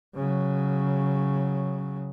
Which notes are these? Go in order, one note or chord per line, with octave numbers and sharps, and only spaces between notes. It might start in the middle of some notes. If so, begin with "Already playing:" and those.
C#3 F#3